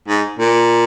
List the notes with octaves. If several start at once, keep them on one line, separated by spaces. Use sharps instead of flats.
G#2
A#2